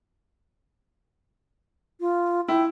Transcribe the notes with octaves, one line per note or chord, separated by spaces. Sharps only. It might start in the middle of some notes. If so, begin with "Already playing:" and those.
F4
E4 G5